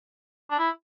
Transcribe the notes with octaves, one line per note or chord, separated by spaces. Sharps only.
D4
E4